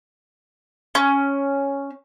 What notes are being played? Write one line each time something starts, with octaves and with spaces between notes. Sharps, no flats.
C#4